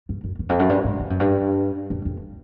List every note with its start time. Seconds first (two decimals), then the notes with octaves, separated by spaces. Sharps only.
0.09 G2
0.24 F#2
0.39 E2
0.49 F2
0.60 F#2
0.69 G2
0.84 G#2
1.00 G2
1.10 F#2
1.20 G2
1.90 F#2
2.05 F2